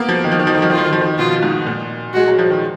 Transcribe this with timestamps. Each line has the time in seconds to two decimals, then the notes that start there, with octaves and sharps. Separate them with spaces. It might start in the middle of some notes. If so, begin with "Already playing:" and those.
Already playing: A#3 B3
0.09 F3
0.24 D#3
0.32 F3
0.39 D#3
0.47 F3
0.55 D#3
0.62 F3
0.70 D#3 F4
0.78 F3
0.86 D#3
0.93 F3
1.01 D#3
1.18 B2 F4
1.43 G#2
1.66 A#2
2.13 G#3 F#4
2.28 F#3
2.38 F3
2.50 D#3